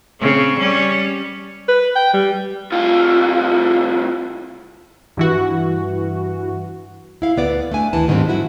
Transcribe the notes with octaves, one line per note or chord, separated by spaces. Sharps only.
C#3 C4
G3 C#4
B4
G5
G3
C2 F4
G2 E3 F#4
E4 F5
D2 B3 D5
A3 D4 G#5
D#2 E3 A5
G#2 D#3 G3 A3 C4 D4
F#3 E4 F#4